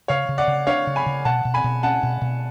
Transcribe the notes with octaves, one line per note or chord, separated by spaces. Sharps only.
C#3 C#5 F5
C#3
D5 F#5
C#3
D4 C#5 F5
C#3
G#5 B5
C#3
B2 F#5 A5
B2
G#5 B5
B2
C#4 F#5 A5
B2
B2